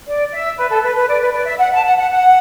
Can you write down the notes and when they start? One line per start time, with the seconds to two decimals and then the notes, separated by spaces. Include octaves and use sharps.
0.06 D5
0.31 E5
0.57 B4
0.69 A4
0.82 B4
0.95 B4
1.08 D5
1.20 B4
1.33 D5
1.45 E5
1.58 F#5
1.72 A5
1.84 F#5
1.96 F#5
2.10 F#5